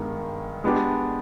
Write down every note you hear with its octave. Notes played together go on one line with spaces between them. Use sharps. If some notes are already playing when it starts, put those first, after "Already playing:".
Already playing: G2 D#3 G#3 B3
G#3 B3 D4 G4